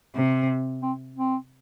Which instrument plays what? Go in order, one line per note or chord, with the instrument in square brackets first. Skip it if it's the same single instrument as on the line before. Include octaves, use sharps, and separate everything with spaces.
[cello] C3
[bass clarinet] C4
C4